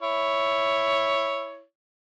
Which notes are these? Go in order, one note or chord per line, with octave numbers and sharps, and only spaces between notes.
E4 C#5